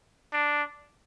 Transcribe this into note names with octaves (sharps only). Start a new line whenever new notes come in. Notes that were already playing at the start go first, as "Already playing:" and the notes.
D4